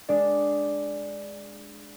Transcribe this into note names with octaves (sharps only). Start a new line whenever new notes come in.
G#3 D4 D5